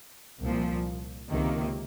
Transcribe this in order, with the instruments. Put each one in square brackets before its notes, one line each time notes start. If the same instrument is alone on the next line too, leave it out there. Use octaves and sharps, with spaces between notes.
[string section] C2 A#2 F3
C#2 C3 D#3 A#3